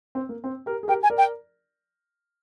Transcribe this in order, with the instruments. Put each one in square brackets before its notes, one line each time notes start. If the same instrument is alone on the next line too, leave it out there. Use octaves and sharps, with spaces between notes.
[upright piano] C4
A#3
C4
G4 A#4
G#4
[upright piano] G4 A#4 [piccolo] G5
[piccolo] G#5
[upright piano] A#4 D5
[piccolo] G5